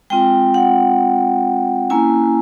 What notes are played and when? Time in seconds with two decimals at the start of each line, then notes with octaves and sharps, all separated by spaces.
0.10 G#3 C4 F4 G5
0.54 F#5
1.90 A#3 C#4 E4 G#5